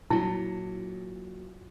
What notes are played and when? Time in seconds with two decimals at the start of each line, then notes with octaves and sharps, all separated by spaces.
0.10 A#2 F#3 E4